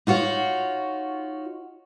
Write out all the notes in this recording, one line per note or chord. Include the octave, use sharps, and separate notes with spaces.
D#4 F4 F#4 C#5